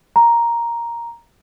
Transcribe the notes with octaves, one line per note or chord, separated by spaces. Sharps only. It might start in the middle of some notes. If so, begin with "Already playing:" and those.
A#5